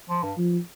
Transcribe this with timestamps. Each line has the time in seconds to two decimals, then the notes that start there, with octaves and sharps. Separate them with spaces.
0.09 F3
0.22 G2
0.38 F3